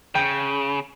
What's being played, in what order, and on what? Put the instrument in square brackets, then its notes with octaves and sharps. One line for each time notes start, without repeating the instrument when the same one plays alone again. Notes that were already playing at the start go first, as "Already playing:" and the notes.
[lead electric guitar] C#3 [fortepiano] G5